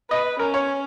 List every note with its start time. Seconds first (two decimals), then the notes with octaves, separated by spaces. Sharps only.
0.10 B4 D#5
0.39 C#4 A#4
0.54 C#5